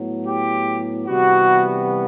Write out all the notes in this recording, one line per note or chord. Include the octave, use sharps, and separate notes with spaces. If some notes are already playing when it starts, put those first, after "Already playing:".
Already playing: A2 F#3 B3
G4
C3 E3 G3 B3 F#4